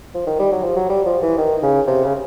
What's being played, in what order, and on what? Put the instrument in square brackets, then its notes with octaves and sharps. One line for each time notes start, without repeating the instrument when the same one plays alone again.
[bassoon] F3
D#3
G3
F#3
F3
F#3
G3
F3
E3
D#3
C#3
C3
C#3